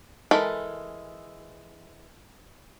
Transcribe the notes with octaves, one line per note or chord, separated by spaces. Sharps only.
E3 G#3 A4 A#4 B5